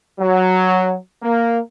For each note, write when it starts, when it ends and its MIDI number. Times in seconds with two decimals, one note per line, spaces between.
0.19 0.96 54
1.22 1.59 58